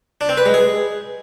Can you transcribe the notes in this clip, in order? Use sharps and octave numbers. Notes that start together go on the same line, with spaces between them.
D4
C4
B4
G#3
G#4